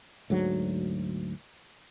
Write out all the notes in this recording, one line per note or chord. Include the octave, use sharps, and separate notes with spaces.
D2 G#2 F#3